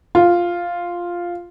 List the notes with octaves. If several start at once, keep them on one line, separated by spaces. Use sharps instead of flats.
F4